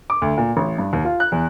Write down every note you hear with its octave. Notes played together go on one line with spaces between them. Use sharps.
D6
D2
A#2
A1
G2
D#2
F4
F#6
E2